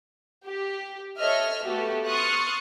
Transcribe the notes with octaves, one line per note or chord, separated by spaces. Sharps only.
G4
A4 C#5 D#5 E5 F6
A3 B3 F#4 G4 A4
C6 C#6 D#6 F6 F#6 A6